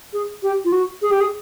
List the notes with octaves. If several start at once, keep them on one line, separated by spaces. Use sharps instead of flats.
G#4
G4
F4
F#4
G#4
G4
G#4